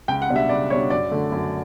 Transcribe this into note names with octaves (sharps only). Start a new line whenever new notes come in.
C#2 G5
F#5
B2 G3 D4
E5
C#2 D5
B2 G3 D4 C#5
F#2 D5
D3 A3
F#2